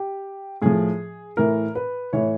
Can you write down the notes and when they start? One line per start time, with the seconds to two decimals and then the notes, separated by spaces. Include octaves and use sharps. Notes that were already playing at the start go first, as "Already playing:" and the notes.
Already playing: G4
0.62 A2 F3 G#4
1.37 A2 E3 A#4
1.75 B4
2.13 A2 E3 C#5